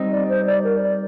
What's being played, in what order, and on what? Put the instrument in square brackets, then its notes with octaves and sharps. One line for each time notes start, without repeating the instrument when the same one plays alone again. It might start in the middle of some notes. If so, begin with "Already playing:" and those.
Already playing: [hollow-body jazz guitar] G3 C4 D#4
[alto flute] D5
C5
D5
A#4
D5